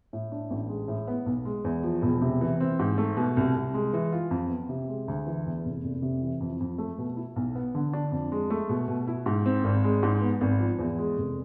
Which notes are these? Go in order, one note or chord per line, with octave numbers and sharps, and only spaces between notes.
A2
D4
A1
G#3
A2
B3
B1
G#3
E2
F3
E1
C3
E3
C4
G#2
A3
B2
C2
C2
G#3
E3
F4
F2
B3
C3
G#3
D2
E3
E2
F1
F1
C3
E3
F2
F2
A3
B2
E4
B1
B3
D3
D4
F2
G#3
A3
B2
B2
E4
G#2
C4
G#1
G#3
G#2
B3
G#1
F3
E2
G#3
F1